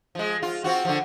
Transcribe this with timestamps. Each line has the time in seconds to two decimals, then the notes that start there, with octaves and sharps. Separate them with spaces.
0.15 F3 G#3
0.43 F4
0.64 C4 F4 F#4
0.85 D3 F3